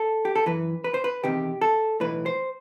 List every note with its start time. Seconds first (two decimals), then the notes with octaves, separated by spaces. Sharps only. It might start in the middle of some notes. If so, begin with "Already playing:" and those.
Already playing: A4
0.25 G4
0.36 A4
0.46 F#2 E3 B4
0.84 B4
0.94 C5
1.04 B4
1.23 E2 C3 D#3 G4
1.61 A4
2.00 B1 A2 E3 B4
2.26 C5